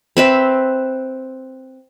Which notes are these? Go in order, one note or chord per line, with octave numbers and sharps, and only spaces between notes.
C4 B4 E5